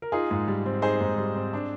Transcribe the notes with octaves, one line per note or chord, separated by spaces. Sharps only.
A#4
D#4 F4 G#4
G#2
G3
C4
D#4 G#4 C5
G#2
G3
C4
D4